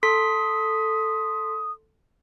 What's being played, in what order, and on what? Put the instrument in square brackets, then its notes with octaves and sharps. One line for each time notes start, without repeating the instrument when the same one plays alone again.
[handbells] A4 C6 B6 [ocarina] D#6